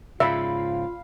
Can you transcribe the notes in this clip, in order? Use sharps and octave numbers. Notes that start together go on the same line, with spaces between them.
G#2 C#3 F4 E5 F5 B5